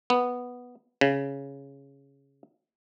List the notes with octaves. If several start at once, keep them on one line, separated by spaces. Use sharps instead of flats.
B3
C#3